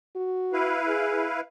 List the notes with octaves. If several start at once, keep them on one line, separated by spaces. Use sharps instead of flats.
F#4
E4 B4 F5
G#4